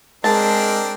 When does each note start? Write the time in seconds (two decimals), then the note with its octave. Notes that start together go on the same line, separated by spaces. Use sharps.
0.24 G#3 C4 D4 A#4 A5